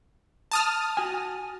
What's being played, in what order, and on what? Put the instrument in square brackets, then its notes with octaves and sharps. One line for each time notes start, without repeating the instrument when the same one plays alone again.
[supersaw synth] A5 D#6 F6
[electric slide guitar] F#4 G#5